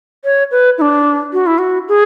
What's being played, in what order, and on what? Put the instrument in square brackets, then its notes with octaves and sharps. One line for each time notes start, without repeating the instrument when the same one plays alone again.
[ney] C#5
B4
E4
D4
F#4
E4
F#4
G#4